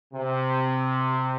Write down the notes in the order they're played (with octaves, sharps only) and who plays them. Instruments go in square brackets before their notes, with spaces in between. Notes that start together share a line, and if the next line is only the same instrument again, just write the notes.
[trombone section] C3